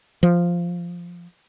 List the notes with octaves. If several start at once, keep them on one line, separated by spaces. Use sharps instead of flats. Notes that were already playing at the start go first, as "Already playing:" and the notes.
F3